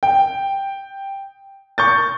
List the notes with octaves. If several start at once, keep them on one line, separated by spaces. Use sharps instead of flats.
G5
C#6 G6 A6